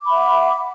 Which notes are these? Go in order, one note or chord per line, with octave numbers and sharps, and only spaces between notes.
E5 F#5 B5 D6